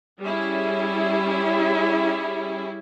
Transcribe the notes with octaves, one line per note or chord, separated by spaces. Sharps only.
G3 C#4 E4 G#4